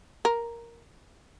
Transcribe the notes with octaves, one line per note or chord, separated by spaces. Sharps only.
A#4